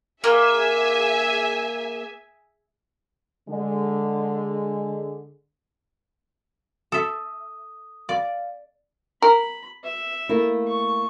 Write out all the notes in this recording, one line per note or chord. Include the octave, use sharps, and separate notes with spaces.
A#3 G#4 E5 G#5
D3 G#3
A4 E5 D#6
D5 F5
A#4 B5
E5
A3 A#3 E4
C#6